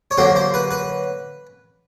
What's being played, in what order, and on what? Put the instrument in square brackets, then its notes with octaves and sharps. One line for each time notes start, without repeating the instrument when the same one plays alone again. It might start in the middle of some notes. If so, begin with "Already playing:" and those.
[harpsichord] C#5
D3 F#3 A#3 C5
C5
B4
B4